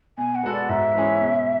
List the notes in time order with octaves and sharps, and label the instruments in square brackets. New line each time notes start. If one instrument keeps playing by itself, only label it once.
[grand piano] B2 [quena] G#5
[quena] F#5
[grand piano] G#3 B3 F#4 A4
[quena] D5
[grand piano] G#2 [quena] E5
[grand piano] E3 G#3 C#4 G#4
B2